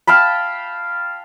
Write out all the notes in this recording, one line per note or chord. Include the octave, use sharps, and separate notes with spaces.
F5 G5 A5 B5